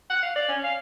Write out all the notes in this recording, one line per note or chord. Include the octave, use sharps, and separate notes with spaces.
F#5
F5
D5
C#4
F5